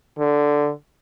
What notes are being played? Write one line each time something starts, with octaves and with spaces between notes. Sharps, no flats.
D3